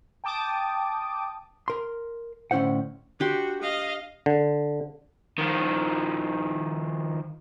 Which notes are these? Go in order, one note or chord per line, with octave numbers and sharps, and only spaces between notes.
G5 A5 D6 D#6
A#4 C6
A2 D3 C#4 E4 C5 F#5
D4 F#4 G4 C6
D#5 F5
D3
D#3 F3